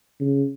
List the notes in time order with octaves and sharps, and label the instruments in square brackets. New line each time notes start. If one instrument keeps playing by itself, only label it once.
[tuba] C#3